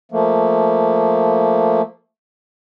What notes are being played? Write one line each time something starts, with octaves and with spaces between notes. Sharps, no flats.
F3 A3 A#3